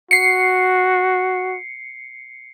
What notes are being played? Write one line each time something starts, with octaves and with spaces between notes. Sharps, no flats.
F#4 C7 C#7